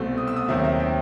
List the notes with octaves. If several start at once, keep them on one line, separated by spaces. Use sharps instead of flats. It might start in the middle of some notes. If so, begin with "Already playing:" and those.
Already playing: C2 B2 A3 C4
D#6
E6
D#6
D#2 D#3 F#3 C4 E5
E5
G5